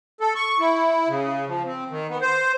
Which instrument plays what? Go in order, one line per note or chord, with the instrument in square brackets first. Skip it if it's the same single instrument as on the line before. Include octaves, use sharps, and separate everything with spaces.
[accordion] A4
C#6
E4
C#3
F3
C4
D#3
B3
C5